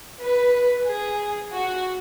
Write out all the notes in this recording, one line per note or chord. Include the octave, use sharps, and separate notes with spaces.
B4
G#4
F#4